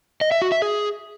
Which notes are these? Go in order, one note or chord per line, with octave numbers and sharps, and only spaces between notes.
D#5
E5
F#4
E5
G#4